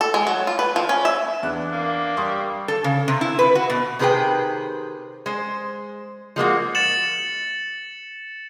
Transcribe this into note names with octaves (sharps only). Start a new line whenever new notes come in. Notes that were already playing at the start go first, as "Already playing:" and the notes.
A4
G#3
F#3
F4
B4
F3
C#4
E5
E2 D4 F#6
A#3
G3 C6 C#6 D#6
A4
C#3
C3
E4
B4
F#4
B2
C3 D#3 G#4 B4 C5 G5
G#3 C5
F3 G#3 A#3 F#4
A6 C#7 E7 F#7